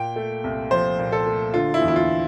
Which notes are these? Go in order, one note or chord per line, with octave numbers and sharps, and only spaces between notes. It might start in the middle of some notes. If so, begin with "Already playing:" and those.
Already playing: A#2 G5
A3
C2
F3 C5
A#2
A4
A3
D3 F4
E4
E2
E4
F4